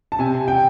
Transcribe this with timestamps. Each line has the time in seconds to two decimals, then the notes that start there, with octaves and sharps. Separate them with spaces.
0.12 A5
0.19 C3 G#5
0.48 G5